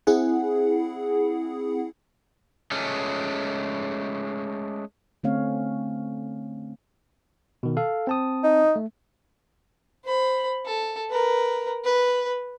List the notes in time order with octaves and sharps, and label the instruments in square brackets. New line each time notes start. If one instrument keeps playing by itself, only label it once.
[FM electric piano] C4 E4 G#4 F#5
[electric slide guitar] G#3 A3 C#4
[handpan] D3 A3 C4 C#4 C#5 F5
[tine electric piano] B2 D#3
A4 F5
C4 A5 D#6
[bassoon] D#4
[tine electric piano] A3
[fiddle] C5 B5
A4
A#4 B4
B4